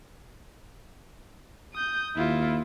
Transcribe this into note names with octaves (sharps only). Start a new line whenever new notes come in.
D#6 G6
D#2 E4 F4